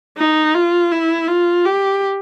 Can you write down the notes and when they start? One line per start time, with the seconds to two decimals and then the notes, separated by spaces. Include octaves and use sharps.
0.18 D#4
0.55 F4
0.92 E4
1.28 F4
1.65 G4